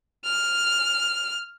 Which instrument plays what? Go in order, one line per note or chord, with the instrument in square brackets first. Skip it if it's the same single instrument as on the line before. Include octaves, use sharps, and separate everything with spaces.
[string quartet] F6